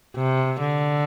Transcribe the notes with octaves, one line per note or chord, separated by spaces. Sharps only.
C3
D3